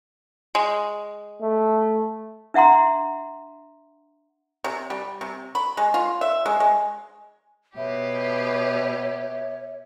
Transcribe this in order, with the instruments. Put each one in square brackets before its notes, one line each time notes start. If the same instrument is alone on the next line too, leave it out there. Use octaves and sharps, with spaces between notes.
[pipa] G#3
[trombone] A3
[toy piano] D4 E5 F#5 A#5 C6
[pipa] C3
G3
C3
B5
G#3
F4
E5
G#3
G#3
[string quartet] B2 G4 B4 [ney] C#5 [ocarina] E5